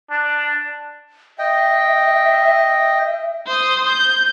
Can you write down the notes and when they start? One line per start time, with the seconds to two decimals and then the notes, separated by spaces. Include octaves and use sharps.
0.11 D4
1.39 D#5 E5 G5
3.47 C5 D#6
3.89 G6